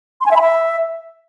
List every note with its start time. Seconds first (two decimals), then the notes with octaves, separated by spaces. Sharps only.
0.21 C6
0.26 G#5
0.31 E5
0.36 B5
0.41 E5